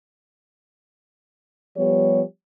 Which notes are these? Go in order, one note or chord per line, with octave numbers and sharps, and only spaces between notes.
F3 G3 B3 G4 C#5